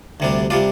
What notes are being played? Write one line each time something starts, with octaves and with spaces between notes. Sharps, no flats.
D2 C3 G3 D4
C3 G3 D4 F4